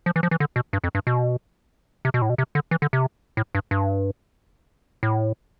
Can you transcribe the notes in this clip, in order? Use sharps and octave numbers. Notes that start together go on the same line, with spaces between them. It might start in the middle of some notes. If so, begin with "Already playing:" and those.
F3
E3
F3
E3
D3
B2
G2
F2
G2
B2
C3
B2
A2
B2
C3
D3
E3
D3
C3
A2
G2
G2
A2